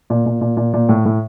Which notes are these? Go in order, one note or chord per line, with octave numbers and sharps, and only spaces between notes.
A#2
A#2
A#2
A#2
A#2
A2
A2